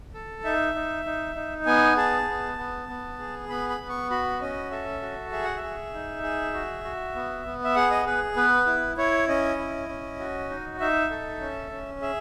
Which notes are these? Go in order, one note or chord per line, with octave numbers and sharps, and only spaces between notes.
A4
D#4 E5
D#4
D#4
D#4
B3 G#5
G#4 A5
B3
B3
B3
G#4
B3 B5
B5
B3
C#6
F#4 B5
C#4 D#5
A4 E5
F#4
G#4 E5
F#5
E5
G#4
D#4
G#4
F#4
F#4
B3
B3
E5
G#4 F#5
D#5
G#4 B4
B3 B4
E4
E4 C#5
C#4 D#5
E4
C#4
F#4
D#4
D#4 E5
A4
C#4
C#4
G#4 E5